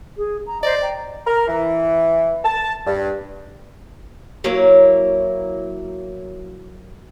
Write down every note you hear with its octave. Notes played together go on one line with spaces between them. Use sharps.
G#4
A#5
C5 D5 D#5
G5 A#5
A#4
E3
A5
G2
F#3 A#3 E4 C#5